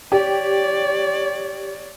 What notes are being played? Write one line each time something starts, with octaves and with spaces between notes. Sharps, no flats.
G4 C#5 D5